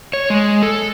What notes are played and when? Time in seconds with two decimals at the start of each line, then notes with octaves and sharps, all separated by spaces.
0.13 C#5
0.30 G#3
0.63 A4